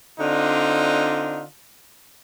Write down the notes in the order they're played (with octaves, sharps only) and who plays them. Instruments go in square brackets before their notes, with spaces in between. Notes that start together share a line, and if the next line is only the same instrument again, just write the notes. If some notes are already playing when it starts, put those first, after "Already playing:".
[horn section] D3 C4 D4 D#4 F4